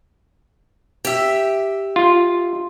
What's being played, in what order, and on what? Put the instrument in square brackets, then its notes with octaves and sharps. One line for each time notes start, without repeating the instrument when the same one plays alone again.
[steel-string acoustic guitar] G4 E5
[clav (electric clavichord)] F4